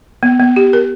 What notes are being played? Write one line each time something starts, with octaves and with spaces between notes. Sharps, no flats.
B3
B3
G4
A#4